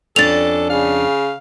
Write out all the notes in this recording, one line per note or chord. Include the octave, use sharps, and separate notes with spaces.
F2 C#4 D4 A4 A6 F7
C#3 F5